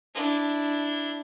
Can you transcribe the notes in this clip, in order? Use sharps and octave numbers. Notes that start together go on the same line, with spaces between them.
D4 E4